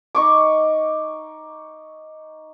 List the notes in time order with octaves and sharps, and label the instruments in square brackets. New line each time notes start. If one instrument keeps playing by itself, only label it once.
[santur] D#4 C#6 D6